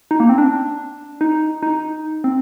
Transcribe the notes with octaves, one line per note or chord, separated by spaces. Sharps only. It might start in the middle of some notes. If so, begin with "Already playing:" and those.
D#4
A#3
C4
D4
D#4
D#4
C4